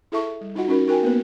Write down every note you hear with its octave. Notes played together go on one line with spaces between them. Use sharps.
E4 G#4 A4 E5 A5 C#6
G3
D#4 F4 F#4 D#5 F#5
C#4 D#4 F#4 A#4
D#4 F#4 A#4 G5 G#5
A#3 B3 B4